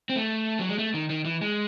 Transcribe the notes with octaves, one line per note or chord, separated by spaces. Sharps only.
C4
A3
F#3
G#3
A3
D#3
D#3
E3
G#3